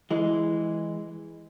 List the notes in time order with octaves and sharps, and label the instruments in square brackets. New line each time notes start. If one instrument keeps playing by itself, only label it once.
[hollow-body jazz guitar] E3 G#3